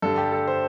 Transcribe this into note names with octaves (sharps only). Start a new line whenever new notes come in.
G2 D3 G3 A4
G4
A4
C5